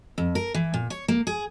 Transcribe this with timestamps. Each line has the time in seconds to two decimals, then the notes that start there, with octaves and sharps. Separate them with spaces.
0.18 F2
0.35 A#4
0.54 E3
0.74 A#2
0.90 C#5
1.08 A#3
1.27 G#4